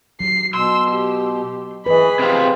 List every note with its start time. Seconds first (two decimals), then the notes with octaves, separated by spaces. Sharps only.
0.20 F#3 C7
0.54 B2 C6 E6
0.91 G4
1.86 E3 G#4 B4 D#5 B5
2.19 C3 C4 F4 C5